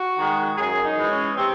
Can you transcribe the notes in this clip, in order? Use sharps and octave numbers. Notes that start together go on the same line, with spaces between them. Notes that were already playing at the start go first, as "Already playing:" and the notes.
Already playing: F#4
D#3 G#3
F#2 G#4
D#4
E3 G#3
C#4
C3 C4